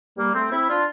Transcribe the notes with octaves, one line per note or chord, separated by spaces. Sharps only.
G3 A#3
A3 C4
C4 E4
D4 F4